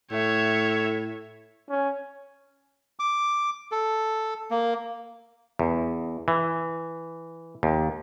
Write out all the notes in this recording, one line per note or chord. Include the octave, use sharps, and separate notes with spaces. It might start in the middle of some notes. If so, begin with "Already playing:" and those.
A2 C#5 E5
C#4
D6
A4
A#3
E2
E3
D#2